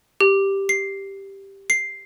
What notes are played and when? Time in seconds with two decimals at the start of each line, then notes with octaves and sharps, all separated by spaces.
0.21 G4
0.69 C7
1.70 C7